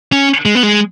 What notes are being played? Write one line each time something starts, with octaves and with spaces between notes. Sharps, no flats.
C#4
G#3
B3
G#3